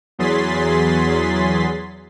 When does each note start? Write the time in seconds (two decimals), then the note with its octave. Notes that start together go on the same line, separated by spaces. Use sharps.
0.19 E2 F#3 G#4 C6 A6 B6